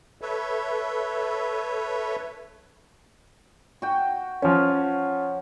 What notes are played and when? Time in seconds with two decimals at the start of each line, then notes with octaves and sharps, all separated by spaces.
0.22 A4 B4 C#5 E5
3.82 F#4 G5
4.42 F3 C#4 C#5